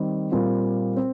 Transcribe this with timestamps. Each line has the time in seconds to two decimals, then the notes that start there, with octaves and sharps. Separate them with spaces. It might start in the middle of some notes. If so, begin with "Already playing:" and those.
Already playing: D#3 G3 C4
0.32 A#2 G3 C4 F4
0.96 C4